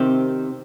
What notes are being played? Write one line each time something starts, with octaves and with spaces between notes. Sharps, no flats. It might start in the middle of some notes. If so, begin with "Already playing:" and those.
Already playing: C3 D#3 C4 G4